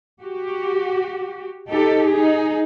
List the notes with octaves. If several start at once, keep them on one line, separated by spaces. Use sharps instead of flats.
F#4 G4
D#4 G4 A4
D#4 G#4